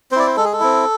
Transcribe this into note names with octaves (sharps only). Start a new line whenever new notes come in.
C4 E4 C5 D5
C5
G#3 A4
G#4
A4
C4 E4